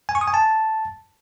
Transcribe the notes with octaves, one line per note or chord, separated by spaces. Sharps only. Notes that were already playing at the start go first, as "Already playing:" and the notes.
G#5
C#6
D#6
G#5
A5